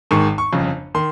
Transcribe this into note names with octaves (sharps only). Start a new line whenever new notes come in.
G#1 G#2 D#3 C#6
C#6
G1 F2 C#3
D#3 C6